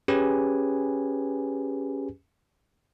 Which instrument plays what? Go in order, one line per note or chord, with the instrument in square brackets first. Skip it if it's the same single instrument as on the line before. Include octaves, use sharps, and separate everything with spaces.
[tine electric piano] C#4 G4 G#4 B4 G#5